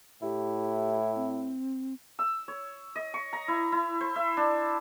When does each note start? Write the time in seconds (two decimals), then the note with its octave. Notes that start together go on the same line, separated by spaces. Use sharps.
0.22 A2 E4 G4
1.16 C4
2.19 E6
2.48 C#5
2.96 D#5
3.14 C#6
3.33 A#5
3.48 E4
3.72 E4
4.01 C5
4.16 E5
4.37 D4